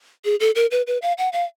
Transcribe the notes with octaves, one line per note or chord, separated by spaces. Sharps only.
G#4
A4
A#4
B4
B4
F5
F#5
F5